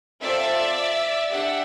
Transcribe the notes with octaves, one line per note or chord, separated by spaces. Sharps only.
C4 F4 A4 D5 E5
D4 G4 E5 F#5